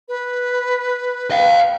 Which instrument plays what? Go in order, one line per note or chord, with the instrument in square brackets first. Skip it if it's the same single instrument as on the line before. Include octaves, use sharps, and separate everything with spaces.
[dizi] B4
[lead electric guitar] D#5 F5